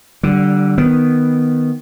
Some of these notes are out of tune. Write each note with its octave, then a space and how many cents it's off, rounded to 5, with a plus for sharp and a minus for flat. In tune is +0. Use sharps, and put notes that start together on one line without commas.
D3 +0 G3 -30
D#3 +0 B3 +0